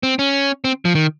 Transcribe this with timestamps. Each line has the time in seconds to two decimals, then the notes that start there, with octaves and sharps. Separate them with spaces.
0.03 C4
0.19 C#4
0.64 C4
0.85 F3
0.95 D#3